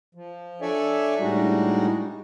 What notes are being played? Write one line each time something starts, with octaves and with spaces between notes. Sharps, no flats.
F3
D4 A4 C#5 D5 E5 G#5
A2 G3 G#3 D4 D#4 F#4